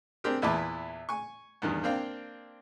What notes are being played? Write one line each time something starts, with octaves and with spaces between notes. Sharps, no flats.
C4 D4 G4 G#4 A#4
E2 A#2 E4 B4 A5 D6
G#5 C#6
E2 G2 D#3
A#3 C4 D4 F5 G5